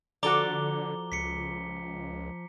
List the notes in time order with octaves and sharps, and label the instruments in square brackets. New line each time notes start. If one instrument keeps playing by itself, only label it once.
[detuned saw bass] D3 [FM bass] F3 [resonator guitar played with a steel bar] F#4 A4 D5 [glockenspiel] A#5 D6 G7
[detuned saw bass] C#2 [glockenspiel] B6 C#7